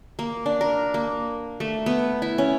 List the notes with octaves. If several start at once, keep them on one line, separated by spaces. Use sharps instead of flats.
A#3
D4
A#4
A#3
A3
B3
E4
C#4